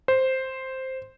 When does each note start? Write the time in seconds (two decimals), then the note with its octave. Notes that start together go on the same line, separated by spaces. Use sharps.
0.08 C5